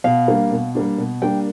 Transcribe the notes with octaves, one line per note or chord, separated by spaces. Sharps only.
B2 F5
G3 A#3 D4
B2
G3 A#3 D4
B2
G3 A#3 D4 G5